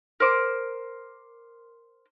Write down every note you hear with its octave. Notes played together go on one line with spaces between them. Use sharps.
A#4 C5 D6